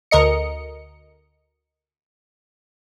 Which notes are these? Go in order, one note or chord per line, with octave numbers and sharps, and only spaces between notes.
D2 A#4 D#5 C#7